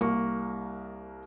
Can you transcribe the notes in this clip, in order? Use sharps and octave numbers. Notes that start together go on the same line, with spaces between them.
C2 A#3 C#6